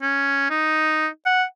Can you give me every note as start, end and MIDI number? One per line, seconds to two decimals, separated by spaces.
0.02 0.50 61
0.50 1.07 63
1.26 1.44 78